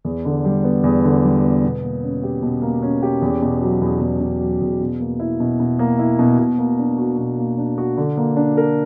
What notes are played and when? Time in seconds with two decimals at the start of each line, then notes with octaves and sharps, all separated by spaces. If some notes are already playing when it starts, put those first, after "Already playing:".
0.05 E2
0.25 D3
0.45 G3
0.64 B3
0.84 E2
1.04 D3
1.23 G3
1.43 B3
1.64 B2
1.83 A#3
2.03 C#4
2.23 G4
2.43 B2
2.62 A#3
2.83 C#4
3.03 G4
3.22 E2
3.42 B2
3.62 F#3
3.81 E2
4.01 E2
4.20 B2
4.41 F#3
4.61 E2
4.81 B2
5.00 A#3
5.20 E4
5.40 B2
5.60 B2
5.79 A#3
5.99 E4
6.19 B2
6.39 B2
6.58 A#3
6.78 D4
6.98 F#4
7.18 B2
7.38 A#3
7.58 D4
7.78 F#4
7.97 D3
8.17 A#3
8.36 D4
8.57 A#4